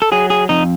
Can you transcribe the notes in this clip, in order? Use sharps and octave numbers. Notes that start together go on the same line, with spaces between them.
A4
F#3 G#4
G#4
F2 D#4